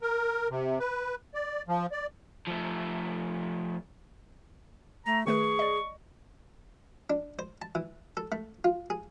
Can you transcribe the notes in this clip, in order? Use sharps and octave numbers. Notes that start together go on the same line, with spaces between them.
A#4
C3
B4
D5
F3
D5
F3 A3
A3 A#5
D#3 A3 G#4 B4 C#6
D5 D#5
D4
C5
A5
E3
A4
A3
F4
G#4